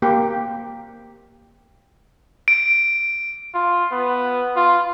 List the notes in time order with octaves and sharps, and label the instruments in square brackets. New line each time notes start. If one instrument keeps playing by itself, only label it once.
[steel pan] A#3 G4
[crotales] D7
[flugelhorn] F4
B3
F4